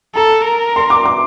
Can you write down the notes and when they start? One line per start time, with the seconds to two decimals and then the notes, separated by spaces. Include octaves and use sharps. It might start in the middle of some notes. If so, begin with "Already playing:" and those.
0.15 A4 A#5
0.45 A#4
0.76 C6
0.90 D6
1.05 D6